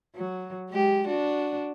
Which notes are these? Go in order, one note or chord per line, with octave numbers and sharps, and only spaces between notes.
F#3
G#3 G4
D4 F#4